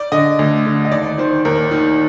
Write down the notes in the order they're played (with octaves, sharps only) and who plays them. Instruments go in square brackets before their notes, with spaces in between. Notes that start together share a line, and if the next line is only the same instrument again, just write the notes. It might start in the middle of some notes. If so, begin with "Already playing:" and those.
Already playing: [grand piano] D5
D3 D#5
D2
D3
D#5
D#2 D5
D#3 C5
D#2 A#4
D#3